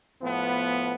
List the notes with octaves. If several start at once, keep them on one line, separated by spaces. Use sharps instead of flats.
A2 F3 B3